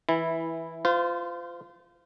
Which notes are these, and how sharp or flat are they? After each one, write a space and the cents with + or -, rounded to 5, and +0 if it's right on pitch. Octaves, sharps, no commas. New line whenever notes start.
E3 -10 E4 +0
F4 -5 C5 -35